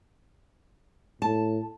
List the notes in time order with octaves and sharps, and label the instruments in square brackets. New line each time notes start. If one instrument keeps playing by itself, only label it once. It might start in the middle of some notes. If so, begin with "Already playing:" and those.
[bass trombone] A2 [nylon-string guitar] A5